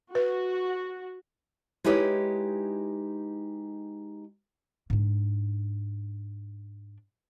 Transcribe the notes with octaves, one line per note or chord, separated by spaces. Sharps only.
F#4 B4
G#3 D#4 E4 G4 B4 C#5
G#2 D4